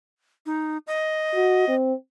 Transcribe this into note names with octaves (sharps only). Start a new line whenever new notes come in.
D#4
D#5
F#4
C4